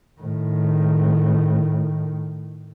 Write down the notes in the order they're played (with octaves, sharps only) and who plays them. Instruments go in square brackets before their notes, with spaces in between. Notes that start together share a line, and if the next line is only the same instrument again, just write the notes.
[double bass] A2 D#3